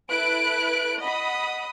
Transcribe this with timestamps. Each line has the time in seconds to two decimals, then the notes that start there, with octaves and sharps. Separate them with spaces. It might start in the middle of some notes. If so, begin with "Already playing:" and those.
0.10 E4 A4 B4 F#6 D7
1.01 D#5 F#5 B5 D#6